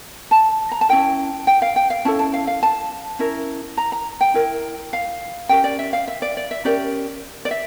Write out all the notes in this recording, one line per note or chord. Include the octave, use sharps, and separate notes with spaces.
A5
A#5
A5
C#4 E4 A#4 G5
G5
F5
G5
F5
C#4 E4 A4 A5
A5
F5
F5
A5
C#4 E4 A#4
A#5
A#5
G5
E4 A#4
F5
C#4 G4 A#4 G5
D5
E5
F5
E5
D5
D5
E5
C#4 G4 A#4 D5
D5
E5